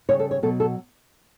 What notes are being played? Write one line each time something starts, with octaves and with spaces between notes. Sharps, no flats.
C#3 G3 C#5
A4
C#5
B2 F#3 A4
A4